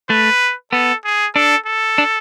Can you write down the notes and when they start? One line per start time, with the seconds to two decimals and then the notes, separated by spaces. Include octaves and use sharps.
0.10 A3 B4
0.72 B3 A4
1.05 G#4
1.35 D4 A4
1.66 A4
1.98 D4